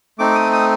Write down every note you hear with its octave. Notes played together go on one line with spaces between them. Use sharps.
A3 C4 D#4 D6
D#6
D#6